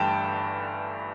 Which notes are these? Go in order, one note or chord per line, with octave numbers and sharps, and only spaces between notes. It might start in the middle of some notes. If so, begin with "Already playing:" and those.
Already playing: G1 G2 E3 A3 G5 A5